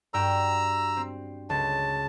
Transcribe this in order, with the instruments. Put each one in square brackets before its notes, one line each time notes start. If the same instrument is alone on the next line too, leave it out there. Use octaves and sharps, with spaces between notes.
[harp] G2 F#4 G5 [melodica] A#5 E6
[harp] C4
[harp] C#2 [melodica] A5